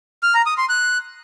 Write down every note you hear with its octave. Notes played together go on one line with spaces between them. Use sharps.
F6
A#5
D#6
C6
F#6